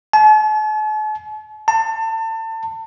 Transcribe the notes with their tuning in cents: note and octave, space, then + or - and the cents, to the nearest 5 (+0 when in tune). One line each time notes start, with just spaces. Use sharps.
A5 -45
A5 +30